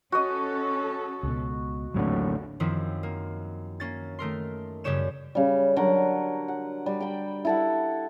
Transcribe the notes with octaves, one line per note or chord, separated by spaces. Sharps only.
C#4 F#4 A4 D#5
C#2 B2
A1 D#2 A2 D3 F#3 C4
F#2 D#3 F3 C4 E4
A#3
A#3 C#4 A6
D#3 A3 A#4 C6
F#2 C#3 G3 G4 C#5 E7
C#3 G3
D3 F#3 A#4 F#5
F#5
G3
G5 B5
E4 A4 F#5